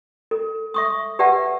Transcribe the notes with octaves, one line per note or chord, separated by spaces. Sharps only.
A4
E5 C#6 D#6
G4 B4 D5 E5 F#5 A5